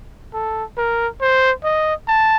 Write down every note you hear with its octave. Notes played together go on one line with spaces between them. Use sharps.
A4
A#4
C5
D#5
A5